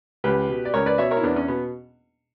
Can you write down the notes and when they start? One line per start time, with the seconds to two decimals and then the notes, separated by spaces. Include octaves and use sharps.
0.24 C#2 G4 B4
0.49 B2
0.65 D5
0.74 C#2 A#4 C#5
0.86 B4 D5
0.98 B2 C#5 E5
1.11 A#4 C#5
1.17 E4
1.23 E2 B3 D4
1.36 C#4
1.48 B2 B3